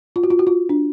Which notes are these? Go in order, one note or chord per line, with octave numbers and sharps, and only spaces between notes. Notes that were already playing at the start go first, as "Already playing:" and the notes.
F4
F#4
F4
F#4
F4
D4